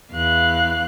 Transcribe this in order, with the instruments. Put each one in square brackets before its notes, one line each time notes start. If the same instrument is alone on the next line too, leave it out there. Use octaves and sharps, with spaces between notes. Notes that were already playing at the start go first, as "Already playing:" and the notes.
[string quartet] E2 F5 F#6